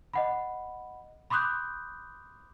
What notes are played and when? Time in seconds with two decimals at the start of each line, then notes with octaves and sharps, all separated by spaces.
0.13 D#5 F#5 B5
1.30 B5 C6 D6 D#6 F#6 G6